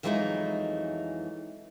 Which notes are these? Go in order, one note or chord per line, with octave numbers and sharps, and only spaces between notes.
F2 E3 F#3 G#3 A3 D#4